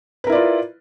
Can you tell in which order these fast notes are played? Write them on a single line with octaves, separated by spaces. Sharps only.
B4 A#4 E4 D5 F4